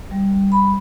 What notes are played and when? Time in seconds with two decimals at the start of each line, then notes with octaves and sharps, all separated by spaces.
0.11 G3
0.32 G3
0.52 G3 B5